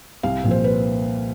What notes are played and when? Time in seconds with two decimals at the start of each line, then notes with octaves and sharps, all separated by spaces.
0.23 C2 F5
0.44 A#2 F3
0.51 C5
0.64 B4